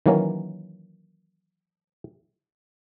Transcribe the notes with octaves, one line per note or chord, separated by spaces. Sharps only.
D#3 E3 F#3 A#3 C#4